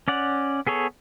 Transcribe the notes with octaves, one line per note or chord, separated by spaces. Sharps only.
C#4 D5 F#5
B3 G#4 A4 C#5